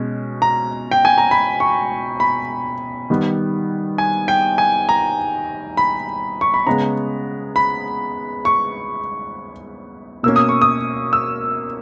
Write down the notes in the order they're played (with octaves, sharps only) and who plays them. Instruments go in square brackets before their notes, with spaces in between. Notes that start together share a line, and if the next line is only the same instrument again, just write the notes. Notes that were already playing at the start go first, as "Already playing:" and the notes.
Already playing: [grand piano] B2 G#3 C#4
A#5
G5
G#5
A#5
B5
C#6
B5
D#3 G3 B3
G#5
G5
G#5
A#5
B5
C#6
B5
C#3 G#3 B3 A#5
B5
C#6
B2 A#3 C#4 E6
D#6
C#6
D#6
E6